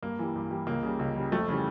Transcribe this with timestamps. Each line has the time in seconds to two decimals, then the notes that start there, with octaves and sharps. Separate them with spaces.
0.02 G2 A#3
0.19 E3 G3
0.36 G2
0.51 E3 G3
0.67 C#2 A#3
0.83 C#3 G3
0.99 C#2
1.16 C#3 G3
1.32 F2 A3
1.49 C#3 E3 G3